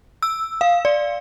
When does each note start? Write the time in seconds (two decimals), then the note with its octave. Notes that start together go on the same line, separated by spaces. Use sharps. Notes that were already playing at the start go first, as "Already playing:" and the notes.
0.22 E6
0.61 F5
0.85 D5